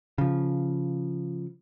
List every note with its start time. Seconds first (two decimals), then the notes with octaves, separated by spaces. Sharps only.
0.18 C#3 F3